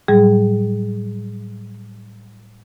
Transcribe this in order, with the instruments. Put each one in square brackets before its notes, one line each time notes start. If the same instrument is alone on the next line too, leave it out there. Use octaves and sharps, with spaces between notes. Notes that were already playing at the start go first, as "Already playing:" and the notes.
[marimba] A2 F#3 G3 G#4